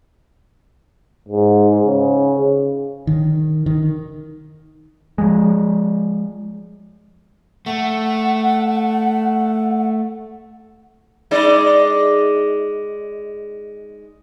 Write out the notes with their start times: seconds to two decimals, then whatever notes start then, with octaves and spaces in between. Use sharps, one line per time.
1.28 G#2
1.87 C#3
3.07 D#3
3.66 D#3
5.18 F3 G#3
7.66 A3 F#5
11.31 G#3 D#4 D5